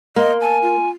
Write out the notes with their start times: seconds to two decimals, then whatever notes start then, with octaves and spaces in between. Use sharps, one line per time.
0.16 A#3 D#5 C6
0.41 G#5 A5
0.62 F4